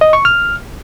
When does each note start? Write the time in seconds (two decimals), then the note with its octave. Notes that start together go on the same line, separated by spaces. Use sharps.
0.01 D#5
0.13 C#6
0.25 F6